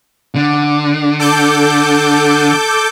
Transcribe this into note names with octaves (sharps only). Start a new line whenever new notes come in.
D3
A4 D6 G6